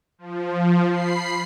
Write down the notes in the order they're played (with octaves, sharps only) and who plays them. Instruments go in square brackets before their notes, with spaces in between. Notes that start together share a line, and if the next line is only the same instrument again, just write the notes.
[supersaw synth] F3
B5 C7